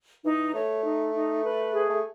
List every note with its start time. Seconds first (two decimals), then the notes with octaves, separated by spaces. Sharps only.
0.25 E3 D#4
0.54 A3 C#5
0.83 D#4
1.14 D#4
1.43 B4
1.72 G#4
1.89 A3